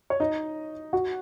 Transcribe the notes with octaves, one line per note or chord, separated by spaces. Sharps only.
C#5
D#4 D#5
F#4 F#5